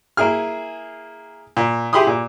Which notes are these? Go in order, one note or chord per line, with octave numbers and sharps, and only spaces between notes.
A#3 E4 G#4 F6
A#2
E4 G4 G#4 B5 C6 D#6
A#2